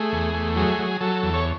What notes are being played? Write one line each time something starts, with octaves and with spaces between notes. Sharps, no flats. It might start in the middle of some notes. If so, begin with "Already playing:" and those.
Already playing: A3 G#4
E2
A3
F#3 G#4
F#3
F#3 A4
E2
C#5